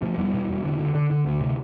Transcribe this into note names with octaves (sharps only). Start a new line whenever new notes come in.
B2 F3 A3
E2 G3 B3
B2
E2
D3
D3
D3
D3
D2
C3